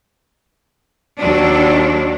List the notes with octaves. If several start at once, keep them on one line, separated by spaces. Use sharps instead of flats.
D#2 F#3 D4